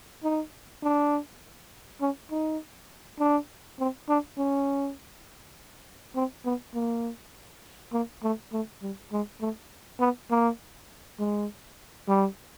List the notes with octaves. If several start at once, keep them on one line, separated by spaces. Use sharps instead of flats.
D#4
D4
C#4
D#4
D4
C4
D4
C#4
C4
B3
A#3
A#3
A3
A3
G3
G#3
A3
B3
A#3
G#3
G3